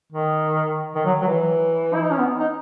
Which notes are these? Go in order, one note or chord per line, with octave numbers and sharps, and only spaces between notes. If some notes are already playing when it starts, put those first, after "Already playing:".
D#3
D#3
F#3
F#3
E3
E4
D#4
C#4
B3
D#4